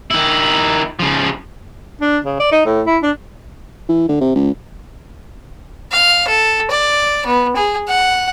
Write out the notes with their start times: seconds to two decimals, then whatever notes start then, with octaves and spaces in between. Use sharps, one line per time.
0.11 D#3 E4
0.99 C#3 F3
2.01 D4
2.25 C#3
2.40 D5
2.52 D#4
2.65 A2
2.86 E4
3.03 D4
3.89 E3
4.09 D3
4.21 C3
4.36 C#2
5.92 F5
6.27 A4
6.70 D5
7.26 B3
7.56 G#4
7.88 F#5